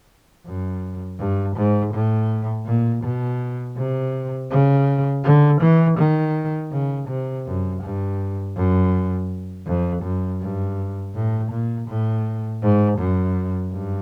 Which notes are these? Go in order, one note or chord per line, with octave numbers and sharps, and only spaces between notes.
F#2
G2
G#2
A2
A#2
B2
C3
C#3
D3
E3
D#3
C#3
C3
F#2
G2
F#2
F2
F#2
G2
A2
A#2
A2
G#2
F#2
G2